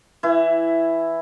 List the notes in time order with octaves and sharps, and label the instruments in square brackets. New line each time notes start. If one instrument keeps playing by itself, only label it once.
[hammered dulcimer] E3 E4